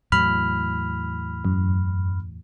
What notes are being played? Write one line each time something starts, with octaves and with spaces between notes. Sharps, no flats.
E2 A2 F#3 B5 F6
F#2